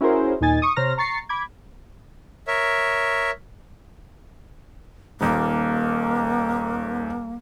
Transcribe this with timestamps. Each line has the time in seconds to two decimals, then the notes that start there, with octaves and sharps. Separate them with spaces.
0.01 C#4 E4 F#4 G#4 A#4 C5
0.41 D#2 A#2 D#4 G#5 A6
0.62 C#6 D#6
0.76 C3 C5 C#5 A#5 F6 A#6
0.98 A#5 C#6 A6 C7 C#7
1.29 B5 D6 G#6
2.47 A#4 C#5 E5
5.21 D#1 D#2 A#3